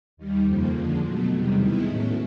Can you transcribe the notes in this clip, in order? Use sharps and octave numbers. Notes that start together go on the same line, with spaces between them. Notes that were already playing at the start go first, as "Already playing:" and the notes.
D#2 D#3 G3
F2 C#3 F3 A#3
D3 F3 G#3
B2 F#3 A3
E2 C3 D#3 G3
D#3 G#3 B3 E4
A2 F#3 A3 C#4